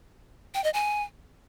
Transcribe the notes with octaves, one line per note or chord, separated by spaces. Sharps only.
G5
D#5
G#5